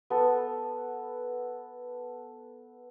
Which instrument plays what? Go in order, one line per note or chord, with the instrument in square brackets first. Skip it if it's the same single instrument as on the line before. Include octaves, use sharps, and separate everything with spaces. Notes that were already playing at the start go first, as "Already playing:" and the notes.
[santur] B3 A4